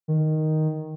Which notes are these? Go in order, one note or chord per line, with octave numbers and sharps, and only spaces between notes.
D#3